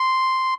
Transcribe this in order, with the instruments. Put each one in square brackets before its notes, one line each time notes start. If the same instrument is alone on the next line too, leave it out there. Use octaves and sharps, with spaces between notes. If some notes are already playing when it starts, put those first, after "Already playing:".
Already playing: [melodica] C6